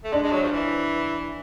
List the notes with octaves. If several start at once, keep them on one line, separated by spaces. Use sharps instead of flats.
A3
G#3 D4
G#3
F#3
F3
E3